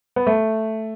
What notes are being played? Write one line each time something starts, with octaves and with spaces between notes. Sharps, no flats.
B3
A3